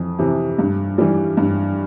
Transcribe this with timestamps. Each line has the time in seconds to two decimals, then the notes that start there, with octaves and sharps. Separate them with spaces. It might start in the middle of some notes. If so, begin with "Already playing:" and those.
Already playing: F2 E3
0.19 C3 E3
0.59 G2
0.98 E3 G3
1.37 G2